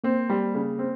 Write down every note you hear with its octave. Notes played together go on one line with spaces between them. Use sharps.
A#3 C4
G3
C#3
C4